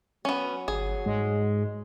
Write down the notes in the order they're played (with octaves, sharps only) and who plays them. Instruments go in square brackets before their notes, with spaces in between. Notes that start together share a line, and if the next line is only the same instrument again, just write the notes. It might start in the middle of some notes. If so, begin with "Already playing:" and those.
[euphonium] F#3 [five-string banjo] B3 C#4
[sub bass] G1 [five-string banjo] G#4
[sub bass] G#2 [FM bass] G#3